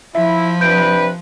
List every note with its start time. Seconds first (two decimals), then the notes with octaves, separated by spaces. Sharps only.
0.15 F3 E4 E5
0.61 C3 D4 B4 G6 D7